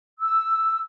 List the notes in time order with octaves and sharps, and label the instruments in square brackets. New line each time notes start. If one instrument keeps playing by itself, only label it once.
[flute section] E6